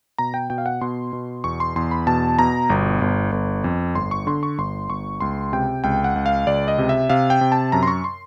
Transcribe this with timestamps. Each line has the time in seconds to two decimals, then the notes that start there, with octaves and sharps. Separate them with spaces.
0.18 B2 A#5
0.34 G5
0.50 B2 G5
0.58 F5
0.66 F#5
0.81 B2 C6
1.13 B2
1.44 E2 C#6
1.60 C6
1.76 E2 C6
1.91 B5
2.07 B2 A5
2.39 B2 A#5
2.70 G1
3.01 G1
3.32 G1
3.64 F2
3.95 G1 C6
4.11 C#6
4.27 D3 C6
4.43 C#6
4.58 G1 C6
4.89 G1 C#6
5.21 C#2 C6
5.53 C3 G5
5.84 C#2 G5
6.04 F#5
6.16 C#2
6.26 F5
6.47 C#2 D5
6.68 D#5
6.78 C3
6.89 E5
7.10 C3 F5
7.30 G5
7.41 C3
7.52 A5
7.72 F#2 A#5
7.83 C6
7.88 C#6
8.04 C6